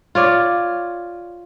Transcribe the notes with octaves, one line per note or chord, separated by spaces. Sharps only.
F4 C#5 D5